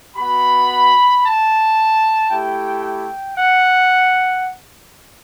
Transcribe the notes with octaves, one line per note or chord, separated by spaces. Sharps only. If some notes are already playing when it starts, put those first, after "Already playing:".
B3 F#4 B5
A5
A3 E4 G4 G5
G5
F#5